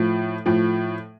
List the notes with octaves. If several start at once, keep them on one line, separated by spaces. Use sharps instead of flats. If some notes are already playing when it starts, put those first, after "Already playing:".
Already playing: A2 F3
A2 F3